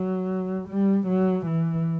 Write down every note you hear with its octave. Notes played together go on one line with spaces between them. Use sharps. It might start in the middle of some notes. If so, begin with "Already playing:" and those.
Already playing: F#3
G3
F#3
E3